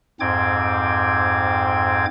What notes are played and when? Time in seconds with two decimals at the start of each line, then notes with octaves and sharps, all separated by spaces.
0.20 F2 G#2 C4 G5 D6 G#6